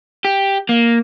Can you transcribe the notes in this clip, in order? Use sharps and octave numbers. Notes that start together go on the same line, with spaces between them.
G4
A#3